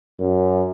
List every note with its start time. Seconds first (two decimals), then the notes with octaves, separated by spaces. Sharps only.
0.19 F#2